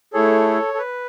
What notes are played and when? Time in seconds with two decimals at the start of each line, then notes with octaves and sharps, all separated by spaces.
0.13 A3 E4 G#4 A4 C#5
0.74 A4
0.78 B4